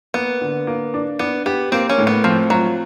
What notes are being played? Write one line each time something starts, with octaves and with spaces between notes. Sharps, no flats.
A#3 B3
D3
A#3
D4
B3 D4
B3 G4
A#3 C4
C#4
A2
B3
F3 C4
F#3 F4